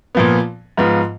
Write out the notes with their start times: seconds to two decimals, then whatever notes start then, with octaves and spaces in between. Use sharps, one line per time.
0.15 A#2 F3 B3
0.77 G#2 F3 B3 F4